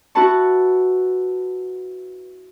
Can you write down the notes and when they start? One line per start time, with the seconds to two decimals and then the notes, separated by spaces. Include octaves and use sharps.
0.15 E4 F#4 B4 F#5 A5 C#6